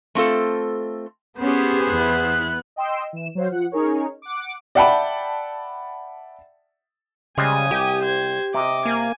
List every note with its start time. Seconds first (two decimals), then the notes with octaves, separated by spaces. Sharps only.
0.15 A3 C4 F4 A4
1.41 B3 C#4 G4 G#4 C5
1.90 E2 E4 F#6
2.76 D#5 G5 C6 E6
3.13 E3 E7
3.35 F#3 C5 F5
3.51 F3 F#5
3.72 C#4 D#4 G#4 A#4 C#5
4.22 F#5 D6
4.75 D5 E5 F#5 G5 A5 B5
7.38 C#3 G3 G#3 C5 G#5 D#6
7.71 C2 G4
8.03 C5 G#6
8.54 C3 D#5 D6
8.85 A#3 G#5